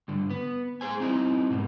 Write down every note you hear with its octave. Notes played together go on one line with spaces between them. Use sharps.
G2 D3
B3
G#4 C5 G#5
C4 D#4 E4
G#2 B2